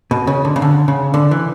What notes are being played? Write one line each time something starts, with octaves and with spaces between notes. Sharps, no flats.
B2
C#3
D3
C#3
D3
C#3
D3
E3